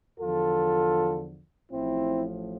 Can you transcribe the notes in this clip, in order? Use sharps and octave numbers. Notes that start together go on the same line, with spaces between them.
E2 D3 F3 F4 A4
A1 A2 F3 C4 E4